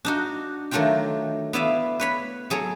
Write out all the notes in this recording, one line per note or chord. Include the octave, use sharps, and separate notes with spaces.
D4 D#4 F#4
D#3 F#3 A3 D4 F4 G5
B3 E4 D5 E5 F5
B4 C#5 B5
F#3 G#4 A4 C#5